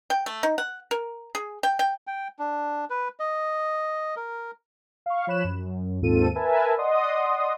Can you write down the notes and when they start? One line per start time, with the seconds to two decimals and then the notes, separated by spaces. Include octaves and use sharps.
0.10 G5
0.26 A3
0.43 D#4
0.58 F#5
0.91 A#4
1.35 G#4
1.63 G5
1.79 G5
2.07 G5
2.39 D4
2.90 B4
3.20 D#5
4.17 A#4
5.06 F5 C#6
5.27 F3 C#5 B5 F#6 E7
5.44 F#2
6.02 D#2 G#2 C4 F4 A4 D#7
6.35 A#4 B4 E5 G#5 A5
6.77 D5 D#5 F#5 C6 D#6